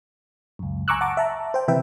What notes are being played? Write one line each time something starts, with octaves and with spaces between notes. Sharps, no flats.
C#2 F#2
G#5 A#5 C#6 D6 E6 F#6
F#5 A5 A#5 C#6 D6
E5 A5 A#5
C5 G5
C3 E3 B4 E5 G5